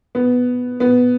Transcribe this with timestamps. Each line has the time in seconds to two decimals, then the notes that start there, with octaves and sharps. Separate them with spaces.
0.15 B3
0.80 B3